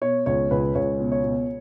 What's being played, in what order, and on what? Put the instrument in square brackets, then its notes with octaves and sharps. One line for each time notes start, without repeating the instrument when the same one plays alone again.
[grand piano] B2 C#5
C#2 C#5
C#2 B4
C#2 C#5
B2
C#5
B2